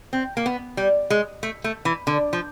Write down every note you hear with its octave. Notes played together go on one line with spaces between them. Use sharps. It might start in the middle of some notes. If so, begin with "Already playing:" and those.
C4
A#3
B3
G3
G#3
A3
A3
E3
D3
F3